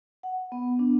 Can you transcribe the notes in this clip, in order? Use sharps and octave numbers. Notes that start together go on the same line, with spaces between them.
F#5
B3
D4